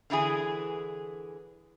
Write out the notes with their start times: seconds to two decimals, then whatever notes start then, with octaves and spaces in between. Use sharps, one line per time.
0.10 D3 E3 E4 G#4